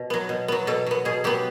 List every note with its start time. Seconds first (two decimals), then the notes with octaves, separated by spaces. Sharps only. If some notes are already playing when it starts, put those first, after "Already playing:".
Already playing: B2
0.10 F#3 B3
0.29 B2
0.48 F#3 B3
0.67 B2 A4
0.86 F#3 B3
1.05 B2 G#4
1.24 F#3 B3 G4